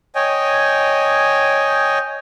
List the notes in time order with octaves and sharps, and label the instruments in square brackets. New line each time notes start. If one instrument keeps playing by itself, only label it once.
[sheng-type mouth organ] C#5 D#5 G5 G#5